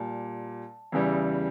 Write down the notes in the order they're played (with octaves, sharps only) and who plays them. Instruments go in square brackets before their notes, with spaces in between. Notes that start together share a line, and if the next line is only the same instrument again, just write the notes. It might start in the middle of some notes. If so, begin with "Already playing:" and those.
Already playing: [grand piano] A#2 G3 A5
E2 C#3 E3 G3